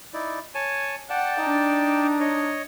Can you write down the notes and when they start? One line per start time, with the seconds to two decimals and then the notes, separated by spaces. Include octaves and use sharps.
0.14 D#4 E4 D5
0.55 C#5 G#5 A5
1.10 D5 F#5 G5 A5
1.39 D4 D#4
2.20 C#5 D#5